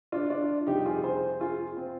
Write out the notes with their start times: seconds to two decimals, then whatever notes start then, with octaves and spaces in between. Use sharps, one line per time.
0.12 D4 F4
0.30 D4 F4
0.67 F2 C3 G3 D#4 G4
0.86 F4 G#4
1.03 G#4 C5
1.40 F4 G#4
1.77 C4